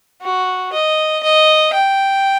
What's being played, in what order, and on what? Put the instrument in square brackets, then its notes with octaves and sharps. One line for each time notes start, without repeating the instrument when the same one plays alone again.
[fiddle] F#4
D#5
D#5
G5